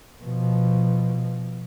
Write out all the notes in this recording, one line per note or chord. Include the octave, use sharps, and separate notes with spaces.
B2 F3